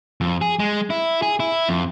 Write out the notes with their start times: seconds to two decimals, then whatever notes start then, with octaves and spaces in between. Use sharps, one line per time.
0.21 F2
0.41 G#4
0.59 G#3
0.90 E4
1.22 G#4
1.40 E4
1.69 F2